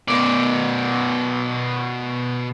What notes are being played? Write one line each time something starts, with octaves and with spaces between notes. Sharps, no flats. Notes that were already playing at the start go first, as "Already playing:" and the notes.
B2 D5